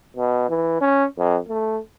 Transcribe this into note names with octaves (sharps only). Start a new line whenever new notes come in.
B2
E3
C#4
F2
A3